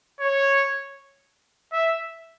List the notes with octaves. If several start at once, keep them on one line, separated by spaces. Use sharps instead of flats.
C#5
E5